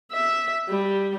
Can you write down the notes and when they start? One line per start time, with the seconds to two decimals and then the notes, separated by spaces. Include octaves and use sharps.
0.12 E5
0.69 G3